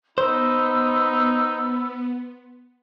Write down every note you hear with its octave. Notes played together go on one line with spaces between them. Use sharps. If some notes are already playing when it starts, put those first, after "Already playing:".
B3 D#4 C5 B5 E6